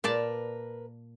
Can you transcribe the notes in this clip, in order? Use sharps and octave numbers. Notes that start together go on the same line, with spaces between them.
A#2 A#4 B4 D5 A5